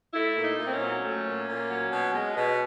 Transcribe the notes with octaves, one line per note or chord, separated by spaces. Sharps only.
A3 E4
A#2
D#4
A#2
C4
C#4
F#3
A3
A#2
A#2
F#3
B2
G#3
B2